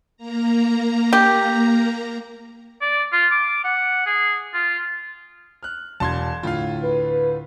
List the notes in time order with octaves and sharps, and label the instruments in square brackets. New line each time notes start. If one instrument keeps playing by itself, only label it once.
[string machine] A#3 A#5
[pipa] G4
[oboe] D5
F4
D6
F#5
G#4
F4
[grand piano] F6 F#6
[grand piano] E1 [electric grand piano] A5 C6 G#6
[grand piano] D2 A2 [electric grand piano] F4 F5
[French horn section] B4